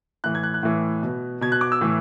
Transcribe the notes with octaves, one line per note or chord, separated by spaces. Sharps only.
A2 E3 F#6
G#6
F#6
F#6
A2 E3
B2
B2 G#6
F#6
D6
E6
A2 E3